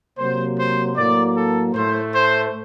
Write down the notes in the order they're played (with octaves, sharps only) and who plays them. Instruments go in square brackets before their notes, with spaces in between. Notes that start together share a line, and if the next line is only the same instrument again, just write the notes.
[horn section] C3 F#3 A#3 C5
C5
A2 F#3 A#3 D5
A4
A2 A3 C5
C5